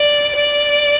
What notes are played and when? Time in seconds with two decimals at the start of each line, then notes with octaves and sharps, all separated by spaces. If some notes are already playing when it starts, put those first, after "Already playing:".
Already playing: D5
0.35 D5